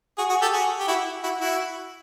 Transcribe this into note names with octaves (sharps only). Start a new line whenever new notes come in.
F#4 G#4
F#4 G#4
G4 A4
F#4 G#4
G4
E4 F#4
E4 F#4
E4 F#4